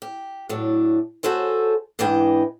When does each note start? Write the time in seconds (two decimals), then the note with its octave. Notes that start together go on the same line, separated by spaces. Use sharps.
0.02 G4
0.49 A2 F#3 D4
1.23 F#4 G#4 A4 C5 C#5
1.99 G#2 E3 B3 D4 D#5 G5